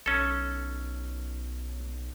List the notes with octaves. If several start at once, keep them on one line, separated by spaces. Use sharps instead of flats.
B1 C#4 A4